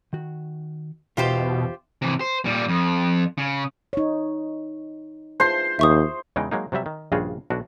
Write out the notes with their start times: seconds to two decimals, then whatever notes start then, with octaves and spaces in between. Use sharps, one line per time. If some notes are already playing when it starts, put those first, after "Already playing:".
0.13 D#3 F#4
1.17 E2 B2 D#4 F4 G4 C5 E5
2.02 C3 E3
2.20 C5
2.45 A#2 G3
2.69 F2
3.38 C#3
3.93 D#4 C#5
5.40 F4 G#4 C5 C6
5.79 D#2 E5 C#6 D#6
6.36 E2 C#3 E3 G#3 D#4 G5
6.51 F#3 G#3 A#3 D#4
6.72 C3 F#3 G3 E5
6.86 D#3
7.12 A#1 G2 C#3 F4 F#4 G#4
7.50 B1 B2 D4 F#4 D5